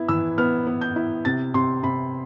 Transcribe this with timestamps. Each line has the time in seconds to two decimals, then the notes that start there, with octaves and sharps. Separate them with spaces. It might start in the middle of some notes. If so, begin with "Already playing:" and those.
Already playing: B3 E4
0.08 E3 E6
0.38 B3 F6
0.67 B3
0.81 G6
0.96 E4
1.25 C3 A6
1.54 C3 C6
1.83 C3 B5